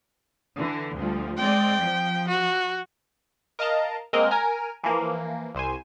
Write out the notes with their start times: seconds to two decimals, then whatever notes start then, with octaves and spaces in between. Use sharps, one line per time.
0.56 D3 E3
0.95 D2 F3 G3
1.37 G#3 C4 D5 G5
1.80 F3
2.28 F#4
3.59 A#4 D#5 F5 A5 A#5
4.13 G#3 A#3 C4 A#4 D#5
4.31 A#4 G#5 A#5
4.84 E3 F3 A#3
5.55 C2 C5 G#5